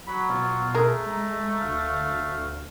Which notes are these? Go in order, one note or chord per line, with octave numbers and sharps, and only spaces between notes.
F#3 B5
B2 F4
A3 G#4 A#4
G#3 A#5
D2 F5